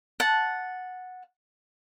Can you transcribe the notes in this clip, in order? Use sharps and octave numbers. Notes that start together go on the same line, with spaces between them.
F#5 A5